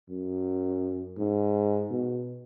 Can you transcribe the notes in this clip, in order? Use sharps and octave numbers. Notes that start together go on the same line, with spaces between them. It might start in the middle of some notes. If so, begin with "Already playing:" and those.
F#2
G#2
B2